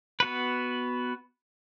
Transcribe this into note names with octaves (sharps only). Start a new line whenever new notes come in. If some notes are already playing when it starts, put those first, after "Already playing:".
B3 F#4 B4